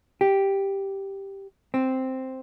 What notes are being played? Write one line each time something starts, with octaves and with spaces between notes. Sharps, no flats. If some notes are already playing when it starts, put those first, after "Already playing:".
G4
C4